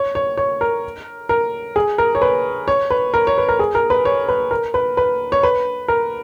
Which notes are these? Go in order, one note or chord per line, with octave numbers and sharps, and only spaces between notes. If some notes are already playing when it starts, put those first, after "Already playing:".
Already playing: C#5
C#5
C#5
A#4
A#4
G#4
A#4
C#5
B4
C#5
B4
A#4
C#5
B4
A#4
G#4
A#4
B4
C#5
B4
A#4
B4
B4
C#5
B4
A#4